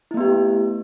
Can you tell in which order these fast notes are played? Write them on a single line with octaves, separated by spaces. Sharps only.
E4 A3 B3 G4